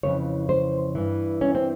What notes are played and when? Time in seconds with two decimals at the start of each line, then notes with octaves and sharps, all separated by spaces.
0.03 F2 C#3 E3 C#5
0.49 C5
0.95 G2 E3
1.41 C#4
1.55 C4